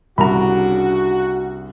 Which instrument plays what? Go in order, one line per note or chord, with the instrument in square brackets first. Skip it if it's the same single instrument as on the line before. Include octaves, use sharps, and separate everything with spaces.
[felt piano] C2 [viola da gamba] C#3 D4 [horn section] F#4 [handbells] A#5 B5